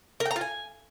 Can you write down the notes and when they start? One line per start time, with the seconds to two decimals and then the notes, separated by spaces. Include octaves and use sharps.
0.20 A#4
0.25 G5
0.31 A#5
0.36 F4
0.41 G#5